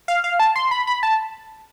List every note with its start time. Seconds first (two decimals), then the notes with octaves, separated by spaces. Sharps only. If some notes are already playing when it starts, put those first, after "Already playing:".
0.08 F5
0.24 F5
0.40 A5
0.56 C6
0.71 B5
0.87 B5
1.03 A5